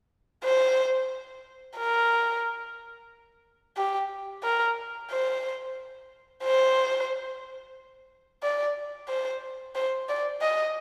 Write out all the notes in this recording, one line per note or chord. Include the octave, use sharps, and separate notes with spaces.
C5
A#4
G4
A#4
C5
C5
D5
C5
C5
D5
D#5